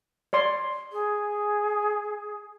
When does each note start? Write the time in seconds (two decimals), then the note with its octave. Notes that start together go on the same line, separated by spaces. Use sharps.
0.33 C#5 D5 C6
0.92 G#4